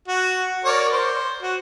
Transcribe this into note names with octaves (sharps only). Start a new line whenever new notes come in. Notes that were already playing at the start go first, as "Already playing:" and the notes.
F#4
A#4 C#5 D5
C5
F#4